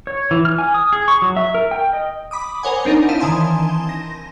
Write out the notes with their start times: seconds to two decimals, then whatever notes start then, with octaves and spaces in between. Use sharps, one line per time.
0.07 C#5
0.31 E3
0.45 F6
0.58 G#5
0.74 D#6
0.93 G#4
1.08 C#6
1.22 F#3
1.37 E5
1.54 A#4
1.71 G5
1.93 D#5
2.31 B5 D6 D#6
2.63 A#4 C5 C#5 F#5 G#5
2.85 C4 D4 D#4 A#4 C#5
3.09 E4 F5 A5 D#7
3.20 D#3 E3 G#5 A5 C6
3.89 A#6